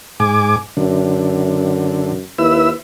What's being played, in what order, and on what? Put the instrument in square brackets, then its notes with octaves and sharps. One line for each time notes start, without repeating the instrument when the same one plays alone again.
[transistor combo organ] G#2 G#5 D6
[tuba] F#2 [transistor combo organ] D3
[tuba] D#2 [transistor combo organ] E4 B4 E6